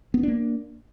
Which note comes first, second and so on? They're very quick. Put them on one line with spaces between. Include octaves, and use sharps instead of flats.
B3 C#4 D4 A#3